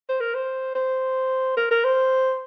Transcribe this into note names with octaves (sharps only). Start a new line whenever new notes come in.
C5
A#4
C5
C5
A#4
A#4
C5